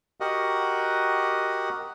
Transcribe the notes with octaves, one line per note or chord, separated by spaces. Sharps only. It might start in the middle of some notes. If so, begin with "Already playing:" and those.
F#4 G4 A#4 D#5 F#5